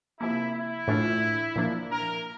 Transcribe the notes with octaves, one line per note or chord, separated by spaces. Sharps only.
C3 F3 A#3 E4
E4
A2 E3 A3 D4 F4
A#2 F3 A#3 D4
A#4